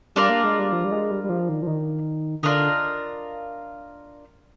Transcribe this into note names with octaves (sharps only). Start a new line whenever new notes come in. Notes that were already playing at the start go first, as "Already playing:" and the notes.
G3 D4 F4 A#4 D5
A#3
G#3
G3
F3
G3
G#3
G3
G3
F3
D#3
F3
D#3
D3 D4 F4 A#4 D#5